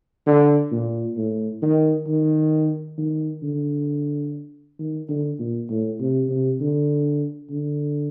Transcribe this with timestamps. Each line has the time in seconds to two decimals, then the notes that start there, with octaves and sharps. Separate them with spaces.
0.26 D3
0.72 A#2
1.17 A2
1.62 D#3
2.07 D#3
2.98 D#3
3.43 D3
4.79 D#3
5.09 D3
5.39 A#2
5.70 A2
6.00 C3
6.29 C3
6.60 D3
7.50 D3